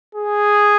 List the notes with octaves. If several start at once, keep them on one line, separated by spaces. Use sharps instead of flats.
G#4